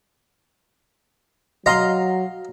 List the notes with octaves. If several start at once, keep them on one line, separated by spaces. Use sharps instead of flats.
F#3 D#5 F5 A#5 C6